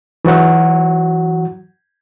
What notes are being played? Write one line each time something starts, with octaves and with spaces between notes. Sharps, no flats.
E3 F#3 F#4 F#5